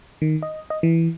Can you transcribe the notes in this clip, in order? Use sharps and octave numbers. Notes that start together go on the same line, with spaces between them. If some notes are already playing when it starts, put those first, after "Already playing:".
D#3
D#5
D#5
E3